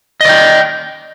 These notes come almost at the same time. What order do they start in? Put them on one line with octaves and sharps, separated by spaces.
D#5 D5 G5